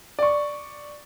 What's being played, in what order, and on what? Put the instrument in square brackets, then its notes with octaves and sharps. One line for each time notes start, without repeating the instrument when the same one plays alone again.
[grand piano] D5 C#6